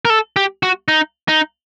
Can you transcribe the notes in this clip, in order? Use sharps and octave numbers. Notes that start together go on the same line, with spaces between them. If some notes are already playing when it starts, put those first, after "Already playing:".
A#4
A4
G4
F#4
D#4
D#4